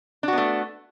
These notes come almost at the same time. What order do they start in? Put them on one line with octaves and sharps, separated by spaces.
D4 F#4 B3 A3